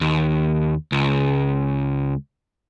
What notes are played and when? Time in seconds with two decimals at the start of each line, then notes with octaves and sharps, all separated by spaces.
0.01 D#2
0.92 C#2